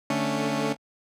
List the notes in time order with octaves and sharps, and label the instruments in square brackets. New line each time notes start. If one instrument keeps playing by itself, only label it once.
[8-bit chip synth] D3 A3 C#4